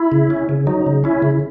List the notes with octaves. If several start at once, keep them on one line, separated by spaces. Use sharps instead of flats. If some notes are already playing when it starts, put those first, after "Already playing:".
Already playing: E4
C#3
C#4
C#3
F#3 D#4
C#3
C#4 E4
C#3